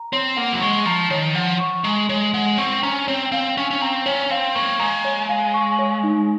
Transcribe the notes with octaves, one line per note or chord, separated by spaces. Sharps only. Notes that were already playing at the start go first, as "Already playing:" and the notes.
Already playing: A#5
C4 C#5
A#3 F#5
F#3
G#3 C#6
F3 A#5
D#3 C#5
F3 F#5
C#6
G#3 A#5
G#3 C#5
G#3 F#5
C4 C#6
C#4 A#5
C4 C#5
C4 F5
C#4 C#6
C#4
C4 A#5
C#4 C#5
C4 F5
A#3 C#6
G#3 A#5
C#5
F5
C#6
C#5
D#4